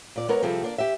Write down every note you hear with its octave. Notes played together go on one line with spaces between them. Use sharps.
A#2 D5
G#3 B3 A#4 C#5 A#5
C3 F3 G3 C4 G#4 A4
A#3 D4 D5
G4 E5